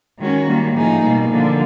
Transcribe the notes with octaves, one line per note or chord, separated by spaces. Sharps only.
D#3 G#3 C#4 F#4
D#3 G3 A#3
A2 F3 A#3 D#4 G#4
B2 G3 A#3
D3 F3 A#3